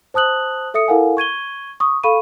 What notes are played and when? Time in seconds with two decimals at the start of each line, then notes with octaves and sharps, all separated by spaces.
0.14 C5 A5 D#6 F#6 F#7
0.74 A4 E5 D#6 C#7
0.88 E4 A4 A#4 F5 F#5 G#5
1.17 C#6 G#6 D#7 G7
1.80 C#6 D#6
2.04 A4 F5 B5 C#6 D#7